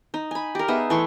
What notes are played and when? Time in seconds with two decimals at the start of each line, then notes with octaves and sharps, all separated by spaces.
0.14 D#4
0.31 G#5 B5
0.55 G4 A#4
0.68 B3 D#4 G#4 E5
0.90 E3 A3 C6 C#6